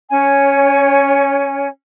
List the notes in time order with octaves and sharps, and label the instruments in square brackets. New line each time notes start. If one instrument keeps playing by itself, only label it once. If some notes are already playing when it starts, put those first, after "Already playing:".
[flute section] C#4 C#5 G#5